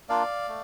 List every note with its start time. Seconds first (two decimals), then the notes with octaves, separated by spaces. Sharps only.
0.09 A#3 D4 F4 D5 F5
0.48 A3